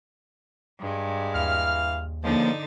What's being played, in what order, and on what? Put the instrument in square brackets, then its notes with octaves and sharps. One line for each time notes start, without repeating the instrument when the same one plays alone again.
[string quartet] G2 G#3
[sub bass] D#2 [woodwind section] E3 F5 F6
[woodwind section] C#2 F3 [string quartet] D3 D#4 A6 [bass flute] A#3